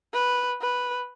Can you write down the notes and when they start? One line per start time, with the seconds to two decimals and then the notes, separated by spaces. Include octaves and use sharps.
0.14 B4
0.61 B4